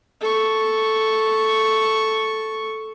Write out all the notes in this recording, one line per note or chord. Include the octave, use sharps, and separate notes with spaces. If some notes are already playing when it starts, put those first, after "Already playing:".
A4 C#6